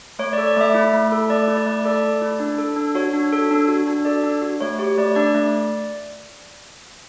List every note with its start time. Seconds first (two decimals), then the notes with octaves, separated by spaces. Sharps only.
0.19 A3 C#5
0.33 D5
0.38 A4
0.47 D5
0.57 A3 E5
0.74 E4
0.94 A3
1.12 A4
1.30 A3 D5
1.48 E4
1.57 D5
1.66 A3
1.85 A4 D5
2.03 A3
2.21 E4
2.40 D4
2.58 A4
2.76 D4
2.95 F#4 C#5
3.13 D4
3.32 A4
3.51 D4
3.68 F#4
3.87 D4
4.05 A4 D5
4.24 D4
4.42 F#4
4.61 A3 C#5
4.79 G4 C#5
4.97 A3 D5
5.15 D4 D5
5.34 A3